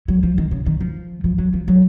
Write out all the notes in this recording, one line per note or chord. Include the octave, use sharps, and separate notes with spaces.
F#3
F3
D#3
C#3
D#3
F3
F3
F#3
F3
F#3